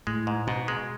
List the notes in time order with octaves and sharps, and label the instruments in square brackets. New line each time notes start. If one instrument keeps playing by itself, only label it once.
[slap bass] A2 [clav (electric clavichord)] G#3
[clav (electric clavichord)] G#2
[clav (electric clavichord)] G#2 [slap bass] B2
[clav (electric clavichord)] G#3